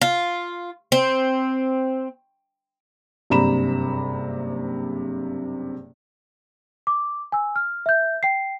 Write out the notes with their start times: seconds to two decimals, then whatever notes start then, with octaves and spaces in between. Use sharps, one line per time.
0.02 F4
0.92 C4
3.30 F#1 G2 C3 A#5 B5 E7
6.87 D6
7.32 G#5 E6
7.56 F6
7.86 E5 G6
8.23 G5 C7